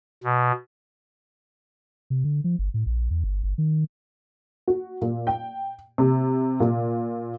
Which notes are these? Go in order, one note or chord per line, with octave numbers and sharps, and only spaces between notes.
B2
C3
D3
F3
G1
A2
A#1
E2
G1
G1
D#3
F#4
A#2
G5
C3
A#2